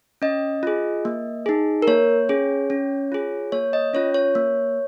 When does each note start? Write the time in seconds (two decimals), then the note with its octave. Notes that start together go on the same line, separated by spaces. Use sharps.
0.22 C#4 D#5
0.63 F4 G#4
1.05 A#3
1.46 D#4 G#4
1.82 A#4
1.87 A#3 C#5
2.29 C#4 G#4
2.70 C#4
3.12 F4 G#4
3.52 A#3 C#5
3.73 D#5
3.94 C#4 F4 C#5
4.14 C#5
4.35 A#3